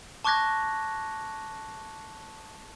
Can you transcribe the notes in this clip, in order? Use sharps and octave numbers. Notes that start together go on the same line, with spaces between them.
A5 C#6 D6 F#6 G#6 A#6